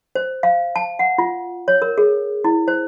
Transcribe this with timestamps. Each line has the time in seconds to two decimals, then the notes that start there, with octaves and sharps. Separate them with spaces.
0.15 C5
0.43 F5
0.76 A5
0.99 F#5
1.18 F4
1.68 C#5
1.82 A#4
1.98 G#4
2.44 E4
2.68 C5